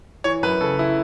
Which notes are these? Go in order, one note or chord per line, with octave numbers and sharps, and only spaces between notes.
E3 C#5
F#2 B4
C#3 A4
E4